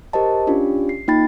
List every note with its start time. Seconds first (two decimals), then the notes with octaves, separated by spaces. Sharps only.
0.13 G4 A#4 C5 D#5 A5
0.47 C#4 D4 F4 G4
0.89 C7
1.08 A#3 D#4 F4 G5 B5 A6